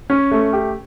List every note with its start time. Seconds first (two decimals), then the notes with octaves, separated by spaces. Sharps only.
0.10 C#4
0.31 A3
0.53 G4